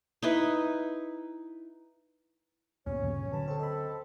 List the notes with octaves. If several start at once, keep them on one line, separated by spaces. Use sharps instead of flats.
D#4 E4 B4
D2 G2 A#2 B3 C#4 C#5
D2 C#3 F3
D3 F#3 B4 A5 B5
C4 A4 C#5
A4 D#5 B5